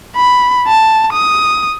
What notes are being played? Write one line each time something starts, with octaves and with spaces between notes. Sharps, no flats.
B5
A5
D#6